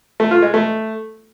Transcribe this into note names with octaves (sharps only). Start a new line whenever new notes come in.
A3
F4
G#3
A3